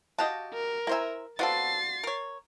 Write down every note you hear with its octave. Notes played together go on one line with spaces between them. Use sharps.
F#4 G4 D#5 F5 A5
A#4
E4 C5 E5 G#5 A#5
B3 C4 F4 F#4 A4 D5 A6 C7
A#4 C#5